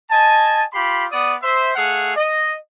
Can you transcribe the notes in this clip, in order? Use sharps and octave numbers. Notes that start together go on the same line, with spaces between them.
D#5 G#5 A5
F4 G4 B5 C6
B3 D5 D#6
C5 E5
A3 G#4 F5 F#5
D#5